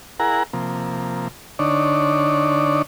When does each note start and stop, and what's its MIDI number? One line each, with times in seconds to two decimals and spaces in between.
0.20 0.43 64
0.20 0.43 68
0.20 0.43 70
0.20 0.43 78
0.20 0.43 82
0.53 1.28 48
0.53 1.28 53
0.53 1.28 58
1.59 2.82 50
1.59 2.82 62
1.59 2.82 63
1.59 2.82 73
1.59 2.82 74